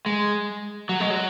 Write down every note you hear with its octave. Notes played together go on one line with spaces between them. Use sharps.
G#3
F#3
G#3
F#3